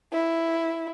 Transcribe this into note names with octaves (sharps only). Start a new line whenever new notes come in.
E4